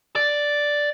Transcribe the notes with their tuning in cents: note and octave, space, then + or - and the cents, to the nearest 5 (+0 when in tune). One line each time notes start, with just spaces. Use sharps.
D5 +0